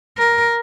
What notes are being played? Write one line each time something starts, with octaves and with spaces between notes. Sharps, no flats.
A#4